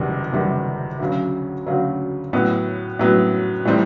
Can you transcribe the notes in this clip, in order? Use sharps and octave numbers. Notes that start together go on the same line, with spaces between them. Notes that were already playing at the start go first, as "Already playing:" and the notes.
Already playing: F#1 E2 C3 D#3 G3
F#1 E2 C3 D#3 G3
D2 C#3 F#3
D2 C#3 F#3
A2 F#3 B3
A2 F#3 B3
A2 E3 G3 C4 D#4